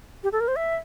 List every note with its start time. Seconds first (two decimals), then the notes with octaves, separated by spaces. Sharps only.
0.24 G4
0.32 A4
0.40 A#4
0.48 C5
0.56 E5